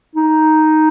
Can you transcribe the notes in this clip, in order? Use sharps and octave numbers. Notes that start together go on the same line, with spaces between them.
D#4